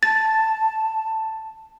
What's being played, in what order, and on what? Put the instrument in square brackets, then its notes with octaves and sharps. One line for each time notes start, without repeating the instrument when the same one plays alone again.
[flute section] A5 [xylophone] A6